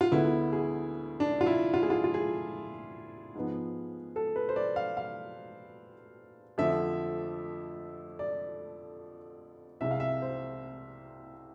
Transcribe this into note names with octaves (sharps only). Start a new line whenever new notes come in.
F4
D2 D3 G#3 B3 E4
G#4
D4
F4
E4
F4
G#4
F4
F4
G#4
G#2 F3 B3
A4
B4
C5
D5
F5
F5
F2 D3 F3 A3 E5
D5
C2 C3 G#3 E5
F5
E5
C5